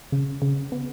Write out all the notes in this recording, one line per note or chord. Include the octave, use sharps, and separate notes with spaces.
C#3
C#3
B3